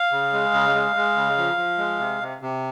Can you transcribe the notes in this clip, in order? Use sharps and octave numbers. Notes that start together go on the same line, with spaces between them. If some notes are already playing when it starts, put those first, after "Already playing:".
Already playing: F5
C#3
G#3
C#3
G#3
G#3
C#3
F3
F3
G#3
C3
C3
C3